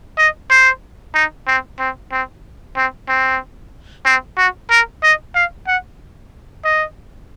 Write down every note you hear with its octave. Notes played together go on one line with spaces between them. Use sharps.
D#5
C5
D#4
C4
C4
C4
C4
C4
C4
F#4
A#4
D#5
F5
F#5
D#5